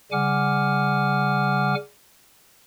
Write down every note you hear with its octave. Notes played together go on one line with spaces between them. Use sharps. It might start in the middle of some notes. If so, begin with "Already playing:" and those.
C#3 G3 F#5 G#5 D6 F6